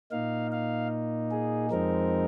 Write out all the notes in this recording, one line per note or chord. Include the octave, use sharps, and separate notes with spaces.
A#2 A#3 D#4 F5
F5
G#4
F2 F3 G#3 C4 D#4 A#4